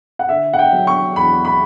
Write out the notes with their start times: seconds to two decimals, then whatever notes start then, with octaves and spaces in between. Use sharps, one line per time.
0.19 F#5
0.29 D3 E5
0.53 F#5
0.59 G5
0.72 F#3
0.87 C#6
1.16 E2 B5
1.45 B5